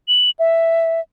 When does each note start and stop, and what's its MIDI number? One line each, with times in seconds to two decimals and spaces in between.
0.08 0.30 102
0.39 1.01 76